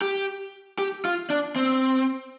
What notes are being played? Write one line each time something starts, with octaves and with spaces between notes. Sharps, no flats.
G4
G4
F4
D4
C4